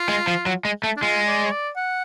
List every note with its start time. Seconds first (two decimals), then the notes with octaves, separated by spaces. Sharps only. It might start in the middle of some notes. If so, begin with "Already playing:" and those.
Already playing: F4
0.09 G#3
0.28 F3
0.46 F#3
0.65 G#3
0.84 A3
0.97 D4
1.02 G#3 F4
1.27 D5
1.46 C#5
1.52 D5
1.76 F#5